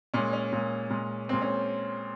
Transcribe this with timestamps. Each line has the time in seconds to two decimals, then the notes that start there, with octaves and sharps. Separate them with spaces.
0.14 A#2 G#3 C#4
0.33 C#4
0.53 A#2 G#3
0.90 A#2 G#3
1.29 A#2 G#3 C4
1.42 C#4